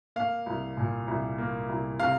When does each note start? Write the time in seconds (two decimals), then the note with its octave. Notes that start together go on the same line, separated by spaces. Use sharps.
0.16 A#3 F5
0.46 C2
0.77 A#2
1.08 C2
1.38 A#3
1.69 C2
1.99 C3 F5